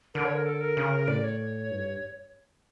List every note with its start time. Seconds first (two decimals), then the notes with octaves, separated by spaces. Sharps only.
0.14 D3 A#4
0.25 C#5
0.35 A#4
0.46 A4
0.61 A#4
0.77 C#3
1.08 A2 D5
1.24 C#5
1.71 G2